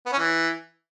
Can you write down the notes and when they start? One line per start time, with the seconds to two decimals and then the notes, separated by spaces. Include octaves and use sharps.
0.06 B3
0.12 C#4
0.19 E3